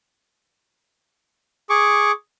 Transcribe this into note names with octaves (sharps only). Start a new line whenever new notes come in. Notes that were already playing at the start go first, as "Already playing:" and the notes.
G#4 C#6 D6